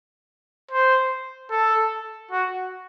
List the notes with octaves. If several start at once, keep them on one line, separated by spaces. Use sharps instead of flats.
C5
A4
F#4